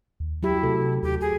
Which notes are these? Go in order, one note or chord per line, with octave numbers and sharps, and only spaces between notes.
D#2
F#3 E4 G4
C3 A3 A4
D#2 G4
D#2 G#4